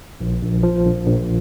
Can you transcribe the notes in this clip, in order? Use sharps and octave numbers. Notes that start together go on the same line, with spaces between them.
A#1
A#1
F3
A#1
A#1